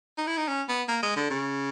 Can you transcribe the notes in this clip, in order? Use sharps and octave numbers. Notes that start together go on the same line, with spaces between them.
D#4
E4
D#4
C#4
B3
A#3
G#3
D3
C#3